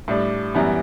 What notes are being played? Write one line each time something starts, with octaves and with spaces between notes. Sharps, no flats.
A2 G3 D4
F#2 E3 G3 B3